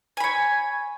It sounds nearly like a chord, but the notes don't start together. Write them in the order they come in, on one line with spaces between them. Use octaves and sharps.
G#5 B5 C#5